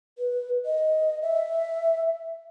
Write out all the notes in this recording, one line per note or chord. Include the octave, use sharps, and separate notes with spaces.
B4
D#5
E5